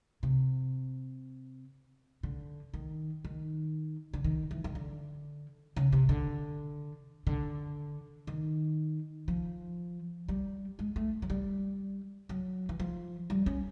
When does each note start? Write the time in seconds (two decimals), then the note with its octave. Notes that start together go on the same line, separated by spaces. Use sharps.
0.23 C3
2.23 D3
2.74 D#3
3.25 D#3
4.13 D3
4.24 D#3
4.51 E3
4.64 D#3
4.75 D3
5.76 C#3
5.92 C3
6.09 D3
7.27 D3
8.27 D#3
9.28 F3
10.28 G3
10.79 G#3
10.96 A3
11.22 F#3
11.30 G3
12.29 F#3
12.69 E3
12.80 F3
13.30 G3
13.46 C#4